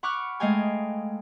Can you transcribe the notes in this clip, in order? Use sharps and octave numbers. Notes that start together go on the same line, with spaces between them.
F#5 B5 C#6 D6 F6 F#6
G#3 A3 D#5 F5 G5 G#5